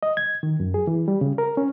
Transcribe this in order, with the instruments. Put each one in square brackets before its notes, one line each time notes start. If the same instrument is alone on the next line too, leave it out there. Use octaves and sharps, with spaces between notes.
[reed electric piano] D#5
G#6
D#3
F#2
G#4
E3
G3
C#3
A#4
C#4